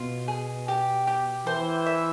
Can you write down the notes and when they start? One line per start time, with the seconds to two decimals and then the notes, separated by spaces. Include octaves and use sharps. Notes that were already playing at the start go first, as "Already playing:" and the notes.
Already playing: B2 F4
0.28 G#4
0.68 G4
1.07 G4
1.47 E3 C5
1.86 E5